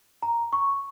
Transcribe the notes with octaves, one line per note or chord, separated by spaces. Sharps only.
A#5
C#6